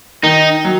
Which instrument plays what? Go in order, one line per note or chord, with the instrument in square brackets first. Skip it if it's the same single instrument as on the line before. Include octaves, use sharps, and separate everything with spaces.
[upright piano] D#3 [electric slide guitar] D#4
[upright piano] F#3